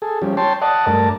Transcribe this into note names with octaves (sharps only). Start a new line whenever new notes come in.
G#4 A4
F3 G3 C#4 G4
C#5 G5 A5 C6
D5 D#5 F#5 A5
G2 A3 A#4 D5 A5